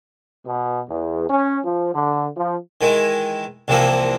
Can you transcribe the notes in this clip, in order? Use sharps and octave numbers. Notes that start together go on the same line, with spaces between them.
B2
E2
C#4
F3
D3
F3
D#3 E3 G#3
C2 C3 E3 F3 A#3 C4